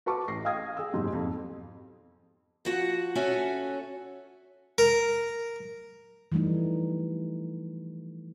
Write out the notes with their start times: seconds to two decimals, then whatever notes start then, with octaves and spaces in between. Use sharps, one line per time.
0.06 F#4 B4 A5 C#6 D6
0.28 A1 A#6 C7
0.44 D#5 F5 G5 D#6 G#6 A#6
0.77 G#4 E6
0.94 F#1 G#2 B2 G4 C6
1.13 F2
2.65 F3 F#4 F#5
3.15 C#4 F#4 A4 C#5 E5 G#5
4.78 A#4
6.32 E3 F3 G3 A3 D#4